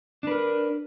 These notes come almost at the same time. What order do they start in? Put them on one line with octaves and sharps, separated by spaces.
D4 B4 A#4